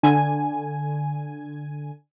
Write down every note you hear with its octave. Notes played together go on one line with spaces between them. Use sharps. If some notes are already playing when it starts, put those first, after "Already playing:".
D3 G#5